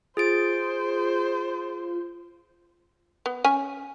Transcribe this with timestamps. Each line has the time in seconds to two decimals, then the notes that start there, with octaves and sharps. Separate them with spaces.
0.17 F4 G#4 C5 A6 D7
3.26 B3
3.44 C#4 G#5